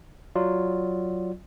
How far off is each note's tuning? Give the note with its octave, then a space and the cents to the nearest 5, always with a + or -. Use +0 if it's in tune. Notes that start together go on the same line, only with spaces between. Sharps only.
F#3 +0 F4 +0 D5 +0